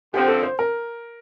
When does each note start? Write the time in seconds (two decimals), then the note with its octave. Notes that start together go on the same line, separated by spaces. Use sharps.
0.13 D3 F3 C4 G4
0.28 A4
0.43 C5
0.59 A#4